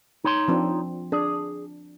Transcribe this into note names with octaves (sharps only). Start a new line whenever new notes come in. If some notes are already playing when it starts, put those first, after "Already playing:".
D#4 C#5 C6
F3 C4 D4
D4 G#4